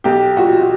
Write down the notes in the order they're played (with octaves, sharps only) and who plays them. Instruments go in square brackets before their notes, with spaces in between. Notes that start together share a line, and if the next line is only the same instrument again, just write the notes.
[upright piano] B1 [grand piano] G4
[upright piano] A#2 [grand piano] F#4
[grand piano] F#4